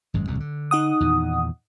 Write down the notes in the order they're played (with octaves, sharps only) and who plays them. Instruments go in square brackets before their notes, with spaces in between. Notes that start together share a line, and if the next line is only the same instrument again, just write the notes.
[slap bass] G#1 F#2 G#3
D1 C2 B2
D3
[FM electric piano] D#4 F#5 D#6
[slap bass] E2 A#2 D#3